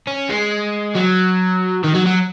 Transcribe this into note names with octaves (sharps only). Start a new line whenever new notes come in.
C#4
G#3
F#3
D#3
F#3
F#3